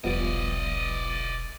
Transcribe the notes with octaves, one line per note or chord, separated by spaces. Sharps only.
E1 B1 F3 G3 B3 D5 D#5